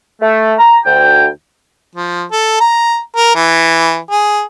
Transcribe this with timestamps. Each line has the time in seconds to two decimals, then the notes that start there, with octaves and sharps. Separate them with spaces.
0.21 A3
0.59 A#5
0.85 D2 G5
1.96 F3
2.32 A4
2.60 A#5
3.16 A#4
3.35 E3
4.11 G#4